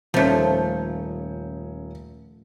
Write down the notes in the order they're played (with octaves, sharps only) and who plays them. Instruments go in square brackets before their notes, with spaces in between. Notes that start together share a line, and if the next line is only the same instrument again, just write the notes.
[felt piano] D#1 C#4 G6 [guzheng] F3 A3